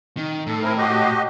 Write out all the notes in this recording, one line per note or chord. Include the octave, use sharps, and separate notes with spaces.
D#3
A2 A4
C4 E4 A#4
F#4 G4 D#5